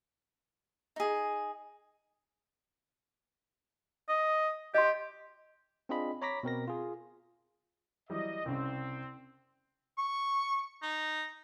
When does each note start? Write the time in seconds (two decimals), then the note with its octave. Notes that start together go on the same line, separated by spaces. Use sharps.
0.96 D#4 G#4
4.09 D#5
4.74 G4 D#5 C6
5.89 C4 D4 F4 G#4 D#5 B5
6.22 C#5 A#5 B5 D6 A#6 B6
6.43 B2 C4 A#4 A#6
6.68 F4 G#4
8.10 E3 F#3 G3 D#5
8.45 C2 C#3 C4
9.98 C#6
10.83 D#4